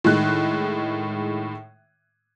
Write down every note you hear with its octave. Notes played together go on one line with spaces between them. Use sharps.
A2 D#3 G#3 F#6